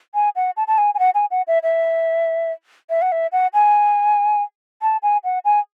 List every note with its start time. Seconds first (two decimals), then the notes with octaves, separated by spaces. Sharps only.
0.14 G#5
0.36 F#5
0.57 A5
0.68 A5
0.78 G#5
0.94 G#5
0.99 F#5
1.14 G#5
1.31 F#5
1.48 E5
1.63 E5
2.90 E5
3.02 F#5
3.12 E5
3.32 F#5
3.54 G#5
4.82 A5
5.03 G#5
5.24 F#5
5.45 G#5